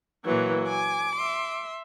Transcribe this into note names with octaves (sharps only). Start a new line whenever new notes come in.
A#2 E3 F#3 A#3
G#5 D6
E5 C6